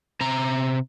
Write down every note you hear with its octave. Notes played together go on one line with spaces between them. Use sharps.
C3 A#5